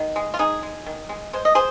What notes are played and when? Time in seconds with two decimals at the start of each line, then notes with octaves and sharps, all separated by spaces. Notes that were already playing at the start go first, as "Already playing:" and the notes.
Already playing: D#3
0.16 G#3
0.34 F4
0.39 G#3 D#4 G#4
0.63 G#3
0.86 D#3
1.09 G#3
1.33 G#3 C5
1.45 D#5
1.55 G#4 C5